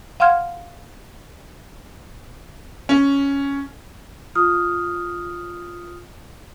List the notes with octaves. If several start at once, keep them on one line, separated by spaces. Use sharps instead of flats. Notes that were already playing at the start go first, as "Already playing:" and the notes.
F5 F#5 C6 F6 G#6
C#4
F4 D#6 F6